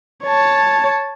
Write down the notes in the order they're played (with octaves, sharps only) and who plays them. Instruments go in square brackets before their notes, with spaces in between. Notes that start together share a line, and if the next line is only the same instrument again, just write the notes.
[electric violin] C#5 A5